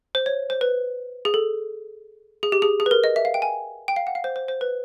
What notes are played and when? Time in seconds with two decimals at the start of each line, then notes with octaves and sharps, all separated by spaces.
0.15 C5
0.26 C#5
0.50 C5
0.61 B4
1.25 G#4
1.34 A4
2.43 G#4
2.52 G4
2.62 G#4
2.80 G#4
2.86 B4
2.91 A#4
3.04 D#5
3.16 E5
3.25 F5
3.34 G5
3.42 G#5
3.88 G5
3.96 F5
4.07 F#5
4.15 F5
4.24 C5
4.36 C5
4.48 C5
4.61 B4